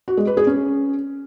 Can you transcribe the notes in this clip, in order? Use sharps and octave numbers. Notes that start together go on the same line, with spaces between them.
F#4
G#3
B4
G#4
C#4